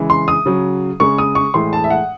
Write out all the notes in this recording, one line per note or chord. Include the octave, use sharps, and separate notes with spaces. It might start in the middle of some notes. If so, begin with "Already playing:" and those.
Already playing: C#3 E3 G#3
C6
D#6
C#3 F#3
C#3 G#3 C#6
D#6
C#6
A2 E3 G#3 C6
A5
E5
F#5